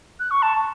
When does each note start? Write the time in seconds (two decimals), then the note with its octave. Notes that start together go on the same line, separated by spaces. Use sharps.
0.20 F#6
0.31 C#6
0.42 A5